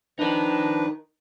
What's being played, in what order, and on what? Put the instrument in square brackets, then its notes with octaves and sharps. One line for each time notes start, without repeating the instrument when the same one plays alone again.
[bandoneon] F3 D4 B4 [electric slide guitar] D#4 A#4